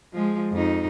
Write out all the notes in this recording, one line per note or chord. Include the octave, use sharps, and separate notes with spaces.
F3 G#3
F2 D#4